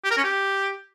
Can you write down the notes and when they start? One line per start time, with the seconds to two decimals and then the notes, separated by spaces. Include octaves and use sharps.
0.04 G4
0.11 A#4
0.17 C#4
0.24 G4